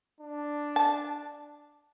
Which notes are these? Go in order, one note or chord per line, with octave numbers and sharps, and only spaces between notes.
D4
A5